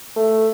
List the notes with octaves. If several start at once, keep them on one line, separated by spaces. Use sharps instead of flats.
A3